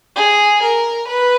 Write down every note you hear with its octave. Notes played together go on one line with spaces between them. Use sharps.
G#4
A#4
B4